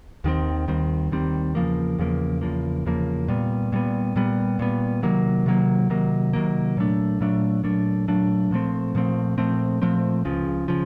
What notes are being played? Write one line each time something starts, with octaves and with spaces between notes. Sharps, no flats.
D#2 D#3 G3 C4
D#2 D#3 G3 C4
D#2 D#3 G3 C4
E2 C#3 F3 A#3
E2 C#3 F3 A#3
E2 C#3 F3 A#3
E2 C#3 F3 A#3
A#2 G3 B3
A#2 G3 B3
A#2 G3 B3
A#2 G3 B3
C3 D#3 F#3 A#3
C3 D#3 F#3 A#3
C3 D#3 F#3 A#3
C3 D#3 F#3 A#3
A#2 F#3 A3 D4
A#2 F#3 A3 D4
A#2 F#3 A3 D4
A#2 F#3 A3 D4
A#2 F3 A3 C4
A#2 F3 A3 C4
A#2 F3 A3 C4
A#2 F3 A3 C4
C#2 C#3 F3
C#3 F3